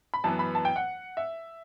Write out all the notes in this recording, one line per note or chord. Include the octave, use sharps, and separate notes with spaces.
B5
F#2 E3 B3 A5
B5
A5
G5
F#5
E5